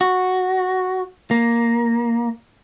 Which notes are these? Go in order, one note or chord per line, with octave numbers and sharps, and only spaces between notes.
F#4
A#3